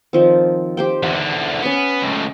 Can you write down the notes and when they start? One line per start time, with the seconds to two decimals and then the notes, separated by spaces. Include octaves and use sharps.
0.13 D#3 F3 C4
0.77 G4 C5 G5
1.03 E2 D3 F#5
1.63 B3 C#4 D6
2.03 C#2 A2